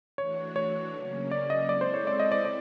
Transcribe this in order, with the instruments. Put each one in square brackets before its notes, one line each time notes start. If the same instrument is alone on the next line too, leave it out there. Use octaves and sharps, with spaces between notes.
[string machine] E3 A3 D4 F#4 [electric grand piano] C#5
[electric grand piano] C#5
[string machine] C#3 F#3 A#3 C#4
[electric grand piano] D5
D#5
[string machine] G#3 C4 E4 A4 [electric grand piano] D5
[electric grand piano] C5
C#5
D5
D#5
D5
D5